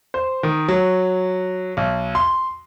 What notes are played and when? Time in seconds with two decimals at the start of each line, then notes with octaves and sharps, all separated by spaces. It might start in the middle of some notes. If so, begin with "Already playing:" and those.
0.14 C5
0.43 D#3
0.68 F#3
1.77 B1
2.15 C6